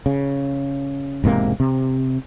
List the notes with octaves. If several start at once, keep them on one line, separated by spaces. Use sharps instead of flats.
C#3
E1 G#2 C3 A#3
C3